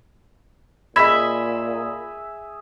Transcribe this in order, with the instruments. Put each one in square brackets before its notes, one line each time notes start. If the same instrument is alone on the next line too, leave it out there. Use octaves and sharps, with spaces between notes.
[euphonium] A#2 [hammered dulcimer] G#4 E5 [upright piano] D#5 B5 [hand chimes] G#6 B6